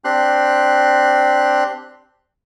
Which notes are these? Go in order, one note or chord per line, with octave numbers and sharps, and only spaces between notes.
C4 D4 G4 C6 F#6